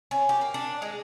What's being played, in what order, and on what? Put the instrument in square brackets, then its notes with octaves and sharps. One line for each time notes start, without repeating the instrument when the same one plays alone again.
[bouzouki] C#4
G4
A#3
D4
G#3